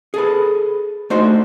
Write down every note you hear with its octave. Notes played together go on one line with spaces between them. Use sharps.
G#4 A4 B4
A3 D4 D#4 F#4 C5